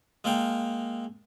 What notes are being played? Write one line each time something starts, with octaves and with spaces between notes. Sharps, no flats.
G#3 A#3 A4 F5 G5